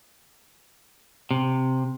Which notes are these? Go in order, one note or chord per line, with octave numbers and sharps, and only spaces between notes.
C3